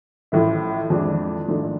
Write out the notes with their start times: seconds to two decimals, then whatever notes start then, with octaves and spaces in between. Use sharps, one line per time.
0.32 A1 A2 F3 A3 E4
0.90 F2 E3 G#3 D4
1.48 G#1 G#2 F3 A3 D4